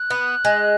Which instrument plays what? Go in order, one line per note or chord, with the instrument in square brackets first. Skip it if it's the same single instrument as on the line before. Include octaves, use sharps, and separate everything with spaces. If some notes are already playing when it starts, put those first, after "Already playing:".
Already playing: [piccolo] F#6
[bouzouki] B3
G#3